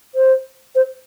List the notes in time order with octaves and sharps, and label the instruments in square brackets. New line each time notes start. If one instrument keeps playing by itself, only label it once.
[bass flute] C5
C5